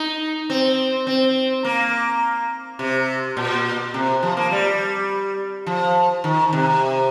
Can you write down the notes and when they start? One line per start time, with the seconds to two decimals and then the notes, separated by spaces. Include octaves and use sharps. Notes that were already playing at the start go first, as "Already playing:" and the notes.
Already playing: D#4
0.50 C4
1.07 C4
1.65 A#3
2.79 C3
3.37 A#2
3.94 C3
4.23 F3
4.37 A#3
4.52 G3
5.67 F3
6.24 D#3
6.53 C3